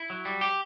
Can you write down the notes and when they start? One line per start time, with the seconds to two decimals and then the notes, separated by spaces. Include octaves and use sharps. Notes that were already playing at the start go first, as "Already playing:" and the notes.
Already playing: E4
0.10 F#3
0.25 G3
0.41 G4